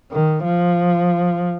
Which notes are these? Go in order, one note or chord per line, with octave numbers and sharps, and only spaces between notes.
D#3
F3